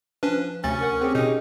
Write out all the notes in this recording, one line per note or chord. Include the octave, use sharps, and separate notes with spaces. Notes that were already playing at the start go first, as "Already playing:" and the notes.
F3 C#4 D4 B4
D2 C3 C#4 A6
A#4 F#5 G#5 C#6
C4 G4 G#4
B2 C#4 D#4 G4